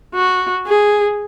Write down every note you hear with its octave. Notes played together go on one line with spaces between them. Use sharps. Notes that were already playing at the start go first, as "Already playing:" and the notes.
F#4
G#4